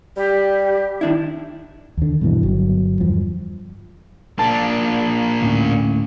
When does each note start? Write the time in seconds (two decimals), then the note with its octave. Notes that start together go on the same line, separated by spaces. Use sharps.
0.17 G3 G4
1.01 D#3 D4 E4
1.97 D#2 D3
2.21 G2 B2 E3
2.43 G1 F#3
3.00 E2 G2 F3
4.39 A#2 D4 A5
5.41 D2 A2 C#4